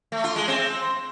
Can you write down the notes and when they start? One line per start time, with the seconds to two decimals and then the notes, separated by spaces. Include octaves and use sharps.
0.12 A3
0.24 F4
0.36 G#3
0.48 C4